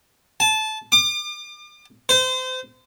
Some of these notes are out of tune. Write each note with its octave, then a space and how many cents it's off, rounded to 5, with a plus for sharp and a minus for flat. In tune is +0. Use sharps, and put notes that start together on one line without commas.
A5 -20
D6 +40
C5 -30